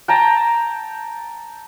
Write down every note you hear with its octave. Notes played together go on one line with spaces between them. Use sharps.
G5 A5 A#5